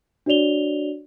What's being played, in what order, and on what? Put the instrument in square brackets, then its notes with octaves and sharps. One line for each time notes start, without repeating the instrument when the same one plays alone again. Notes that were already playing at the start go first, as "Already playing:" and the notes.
[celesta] D4 F#4 C#5 D5 F7 G7